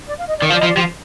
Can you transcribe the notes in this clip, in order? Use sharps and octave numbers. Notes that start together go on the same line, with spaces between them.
D5
F5
D#5
D5
D#3
F3 F5
D5
D#5
F3
D5
F3 G4
F4